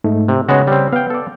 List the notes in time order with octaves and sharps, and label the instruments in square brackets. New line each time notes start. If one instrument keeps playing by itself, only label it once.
[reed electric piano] G#2 A3 D#4
[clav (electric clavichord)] C3
[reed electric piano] C#3 C#5 [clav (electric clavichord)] G#3 B3 F#4
[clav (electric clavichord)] G3 C4
[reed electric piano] B3 [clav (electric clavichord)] F5 G5
[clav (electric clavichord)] A4 D5